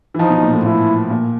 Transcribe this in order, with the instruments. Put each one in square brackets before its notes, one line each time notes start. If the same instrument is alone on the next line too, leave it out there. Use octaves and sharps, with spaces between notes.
[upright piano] E3
[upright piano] F3 [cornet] D#4
[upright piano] B2
A#2
A2
[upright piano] A#2 [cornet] E4
[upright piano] A#2